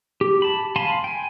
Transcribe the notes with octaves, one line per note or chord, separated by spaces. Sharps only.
G4
A5 B5
F5 G#5 A5 B5 C6
G5 G#5